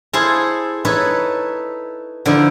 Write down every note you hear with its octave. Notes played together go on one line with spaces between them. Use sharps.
E4 G#4 A4 C5 F5
D#4 E4 A4 B4 C#5
D3 F3 D#4 E4